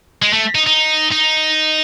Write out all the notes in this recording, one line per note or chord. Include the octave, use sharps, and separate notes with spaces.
G#3
A3
D#4
D#4
D#4